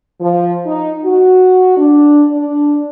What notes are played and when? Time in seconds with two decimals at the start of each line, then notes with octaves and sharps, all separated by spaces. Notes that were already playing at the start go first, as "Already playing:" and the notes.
0.20 F3
0.66 D#4
1.03 F#4
1.77 D4
2.31 D4